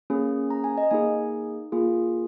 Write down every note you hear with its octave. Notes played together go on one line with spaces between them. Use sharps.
A#3 C#4 G#4
A#5
G#5
D#5
A#3 D#4 G#4 G#5
A#3 F4 G#4